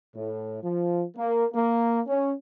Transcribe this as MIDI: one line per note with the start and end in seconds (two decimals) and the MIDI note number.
0.16 0.61 45
0.64 1.04 53
1.17 1.46 58
1.54 2.01 58
2.08 2.33 61